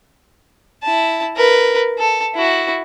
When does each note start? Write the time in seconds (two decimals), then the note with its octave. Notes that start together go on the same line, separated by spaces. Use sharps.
0.83 E4 A5
1.36 A#4 B4
1.98 A4
2.34 E4 F#4